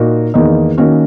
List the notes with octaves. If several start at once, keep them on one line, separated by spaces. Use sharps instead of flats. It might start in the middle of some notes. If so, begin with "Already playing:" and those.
Already playing: A#2 A#3 D#4 F#4
E2 D#3 A#3 D#4
D#3 A#3 C#4 F#4